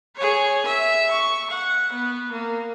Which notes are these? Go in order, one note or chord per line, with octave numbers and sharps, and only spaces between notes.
G#4 C#5
E5
C#6
F#5
B3
A#3